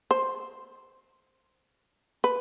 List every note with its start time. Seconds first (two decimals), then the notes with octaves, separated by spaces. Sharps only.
0.11 C5
2.24 B4